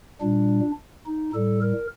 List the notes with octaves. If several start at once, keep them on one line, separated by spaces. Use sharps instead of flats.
A#2 G3 D4
D#4
A2 G3 A4
A#4